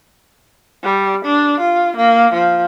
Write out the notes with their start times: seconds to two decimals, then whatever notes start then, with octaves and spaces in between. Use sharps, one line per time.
0.84 G3
1.25 D4
1.60 F4
1.96 A#3
2.33 F3